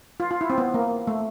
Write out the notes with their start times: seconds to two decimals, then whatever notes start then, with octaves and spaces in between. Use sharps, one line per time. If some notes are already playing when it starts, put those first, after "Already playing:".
0.20 F4
0.31 F4
0.41 E4
0.50 C4
0.58 B3
0.74 A#3
1.07 A3